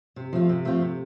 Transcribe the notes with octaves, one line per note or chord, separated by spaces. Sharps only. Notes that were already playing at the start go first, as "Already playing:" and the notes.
C3
F3 A3 C4 F4
C3
F3 A3 C4 F4
C3